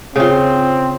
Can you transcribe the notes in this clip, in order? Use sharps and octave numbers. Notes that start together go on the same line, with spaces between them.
C#3 C4 F4